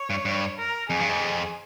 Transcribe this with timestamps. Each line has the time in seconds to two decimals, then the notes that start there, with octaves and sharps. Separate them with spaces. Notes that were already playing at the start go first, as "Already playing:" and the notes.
Already playing: C#5
0.10 G2
0.25 G2
0.58 A#4
0.89 F2 G#4
1.00 G2
1.10 F2